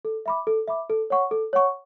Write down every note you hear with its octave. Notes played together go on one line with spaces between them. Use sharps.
A4
E5 B5 D6
A4
E5 B5 D6
A4
C#5 F#5 C#6
A4
C#5 F#5 C#6